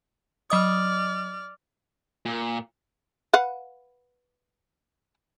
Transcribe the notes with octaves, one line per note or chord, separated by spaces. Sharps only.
F#3 D5 D#5 D#6 F6
A#2
B4 F5 F#5